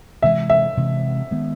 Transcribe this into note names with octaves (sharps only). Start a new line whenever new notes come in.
C3 E3 G#3 E5
E5
C3 E3 G#3
D#3 G#3 B3